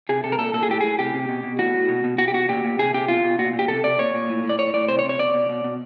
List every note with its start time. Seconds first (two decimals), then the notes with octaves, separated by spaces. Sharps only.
0.09 C3 G#4
0.24 C3 A4
0.32 A#4
0.39 A#2 A4
0.54 A#2 A4
0.63 G#4
0.69 A2 G4
0.81 A2 G#4
0.99 C3 G4
1.14 C3
1.29 B2
1.43 B2
1.59 A2 F#4
1.74 A2
1.88 B2
2.04 B2
2.18 B2 F#4
2.28 G4
2.34 B2 F#4
2.49 A#2 G4
2.64 A#2
2.79 C3 G#4
2.94 C3 G4
3.08 B2 F4
3.23 B2
3.39 A#2 F#4
3.53 A#2
3.59 G4
3.68 C3 A4
3.83 C3 D5
3.99 A#2 C#5
4.14 A#2
4.29 A2
4.44 A2
4.49 D5
4.59 A2 C#5
4.74 A2 D5
4.88 C3 C5
4.99 C#5
5.04 C3
5.09 C#5
5.19 B2 D5
5.34 B2
5.49 B2
5.64 B2